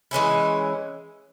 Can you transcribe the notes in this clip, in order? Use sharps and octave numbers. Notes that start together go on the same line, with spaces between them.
E3 G#3 C#4 E4